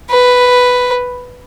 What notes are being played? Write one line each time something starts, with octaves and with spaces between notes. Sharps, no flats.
B4